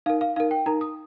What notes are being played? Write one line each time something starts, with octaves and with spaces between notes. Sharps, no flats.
D#4 A#4 F5
F5
D#4 A#4 F5
G5
D#4 A#4 A#5
D#6